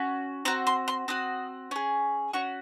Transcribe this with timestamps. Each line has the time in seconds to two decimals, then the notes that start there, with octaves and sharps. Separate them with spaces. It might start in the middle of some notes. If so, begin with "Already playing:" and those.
Already playing: C#4 F#4
0.45 C4 F#4 A#5
0.67 C6
0.88 C6
1.08 C4 F#4 D#6
1.71 C#4 G#4
2.33 C#4 F#4 C#6